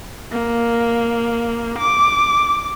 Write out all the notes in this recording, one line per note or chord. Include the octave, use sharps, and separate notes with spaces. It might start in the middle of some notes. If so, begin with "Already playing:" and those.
A#3
D6